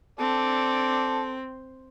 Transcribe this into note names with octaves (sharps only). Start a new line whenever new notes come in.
C4 A4 D5